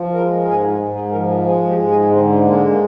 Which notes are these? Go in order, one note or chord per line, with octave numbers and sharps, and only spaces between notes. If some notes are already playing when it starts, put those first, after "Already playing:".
Already playing: F3
G#3 A#4
A#4
G#2 G#4
G#2
G#4
F3 A#4
G#4
G#3 G#4
G4
G#2
G#4
D3 C4
G#3 A#3
A#3